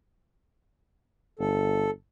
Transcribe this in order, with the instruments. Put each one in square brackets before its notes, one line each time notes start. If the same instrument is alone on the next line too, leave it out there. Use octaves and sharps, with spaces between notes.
[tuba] G1 [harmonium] A4